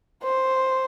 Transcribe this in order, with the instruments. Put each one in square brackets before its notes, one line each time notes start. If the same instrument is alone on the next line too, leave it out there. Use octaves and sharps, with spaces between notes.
[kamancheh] C5